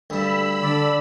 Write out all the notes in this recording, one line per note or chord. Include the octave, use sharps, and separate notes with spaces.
D2 G2 B5 E6
D3 D5